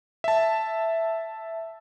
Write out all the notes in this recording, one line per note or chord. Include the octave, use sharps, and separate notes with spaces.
E5 A5